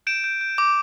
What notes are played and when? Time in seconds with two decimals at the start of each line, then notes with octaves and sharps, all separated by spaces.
0.07 G6 D7 E7
0.24 G6
0.41 G6
0.58 D6